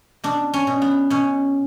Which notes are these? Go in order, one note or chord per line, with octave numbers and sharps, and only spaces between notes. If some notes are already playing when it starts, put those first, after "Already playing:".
B2 D4
C#4
B2
B3
B2 C#4